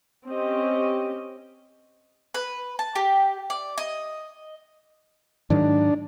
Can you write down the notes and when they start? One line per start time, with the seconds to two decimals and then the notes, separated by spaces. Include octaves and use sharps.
0.25 C4 C#4 G4 D#5
2.34 B4
2.79 A5
2.95 G4
3.50 D5
3.78 D#5
5.50 G#2 D#3 F#3 D4